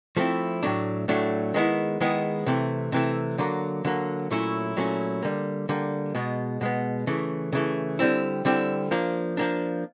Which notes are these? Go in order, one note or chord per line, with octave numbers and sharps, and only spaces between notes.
F3 A3 C4 E4
A2 F#3 A3 D4
A2 F#3 A3 D4
D#3 G#3 B3 E4
D#3 G#3 B3 E4
C3 E3 A3
C3 E3 A3
D3 F#3 A#3
D3 F#3 A#3
A#2 F#3 A3 C#4 E4
A#2 F#3 A3 C#4 E4
D3 G3 A#3
D3 G3 A#3
B2 G#3 B3
B2 G#3 B3
C#3 E3 A3
C#3 E3 A3
D3 G3 C4 E4
D3 G3 C4 E4
F3 A#3 D4
F3 A#3 D4